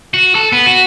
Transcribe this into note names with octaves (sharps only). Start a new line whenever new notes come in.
F#4
A4
B3
F#4